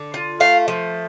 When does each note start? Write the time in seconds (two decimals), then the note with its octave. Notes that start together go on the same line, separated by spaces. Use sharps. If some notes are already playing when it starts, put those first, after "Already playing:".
Already playing: D3
0.14 F4
0.40 A3 F5
0.68 F3